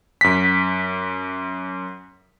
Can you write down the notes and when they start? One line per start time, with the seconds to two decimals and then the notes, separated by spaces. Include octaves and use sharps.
0.21 F#2 B6